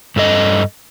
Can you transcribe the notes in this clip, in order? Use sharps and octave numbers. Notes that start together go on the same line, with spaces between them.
G2 A4 D#5